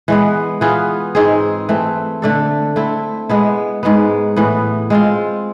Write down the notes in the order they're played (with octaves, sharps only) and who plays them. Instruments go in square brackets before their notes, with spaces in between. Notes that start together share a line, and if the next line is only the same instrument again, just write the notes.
[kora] E3 G#3 B3
E3 B3 F4 G#4
G#2 G#3 C4 G#4
E3 A3 C4
D3 A3 D4 A4
A3 C4 E4
G#3 B3 E4
G#2 G#3 B3
A2 E3 B3
G#3 C4 F4